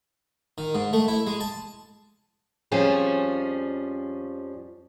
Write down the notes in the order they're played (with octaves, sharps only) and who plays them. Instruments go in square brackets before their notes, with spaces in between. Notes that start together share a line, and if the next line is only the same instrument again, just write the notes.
[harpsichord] D#3
G#2
A3
E4
G#3
A5
[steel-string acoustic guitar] F2 F3 G3 C#4 G#4